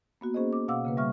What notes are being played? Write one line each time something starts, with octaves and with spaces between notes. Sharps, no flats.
A#3 B3 F#4
A#3 C#4 G#4 C5 D#5
D6
B2 F5 F#5 D6 E6
C#3 A#3 B4
G3 E5 C#6 F6